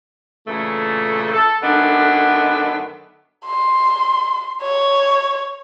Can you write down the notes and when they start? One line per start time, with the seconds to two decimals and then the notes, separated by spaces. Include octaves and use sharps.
0.47 A#2 C#3 E3 A3
1.33 A4
1.62 F#2 D3 D#3 A3 B3 D4
3.45 C6
4.62 C#5